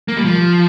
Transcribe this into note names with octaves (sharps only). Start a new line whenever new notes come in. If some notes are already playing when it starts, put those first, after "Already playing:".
A#3
G3
F3